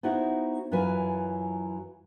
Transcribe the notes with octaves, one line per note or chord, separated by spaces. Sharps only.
B3 D#4 E4 F#4 C5 F#5
F#2 E3 F#3 F4 B4 G#5